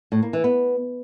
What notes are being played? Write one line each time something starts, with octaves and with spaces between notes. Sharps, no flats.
A2
A#3
E3
B3